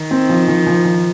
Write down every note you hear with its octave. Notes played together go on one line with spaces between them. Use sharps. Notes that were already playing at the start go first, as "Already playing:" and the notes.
Already playing: D#3
C4
F3
F3
F3
F3